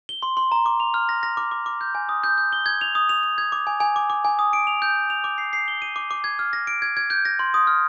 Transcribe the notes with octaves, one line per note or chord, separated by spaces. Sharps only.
G7
C6
C6
A#5
D6
F7
F6
A#6
A#6
D6
D6
D6
G6
G#5
D#6
G6
G6
G7
G#6
F7
D#6
F7
F7
G#6
D6
G#5
G#5
D6
D6
G#5
D#6
D7
F7
G6
F7
F7
D6
C7
C7
G7
D#7
D6
D6
G#6
F6
A#6
D7
G#6
G#6
G6
A#6
C6
D#6
F6